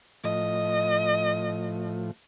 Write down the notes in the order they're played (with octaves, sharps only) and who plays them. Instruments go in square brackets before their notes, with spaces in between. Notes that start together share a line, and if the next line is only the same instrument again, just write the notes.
[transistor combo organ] A2 F3 [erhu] D#5